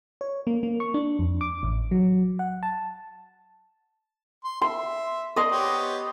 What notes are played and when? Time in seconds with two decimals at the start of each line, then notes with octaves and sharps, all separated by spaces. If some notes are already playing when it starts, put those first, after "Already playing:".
0.21 C#5
0.47 A#3
0.63 A#3
0.80 C#6
0.94 D4
1.19 F2
1.41 D6
1.63 A1
1.91 F#3
2.39 F#5
2.63 A5
4.44 C6
4.62 E5 C6
5.36 D5 D#5 C6
5.52 B3 G4 C#5